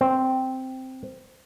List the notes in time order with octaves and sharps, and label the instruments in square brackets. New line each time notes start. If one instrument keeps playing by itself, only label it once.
[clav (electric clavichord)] C4